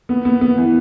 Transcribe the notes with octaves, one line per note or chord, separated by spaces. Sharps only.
B3
B3
B3
E3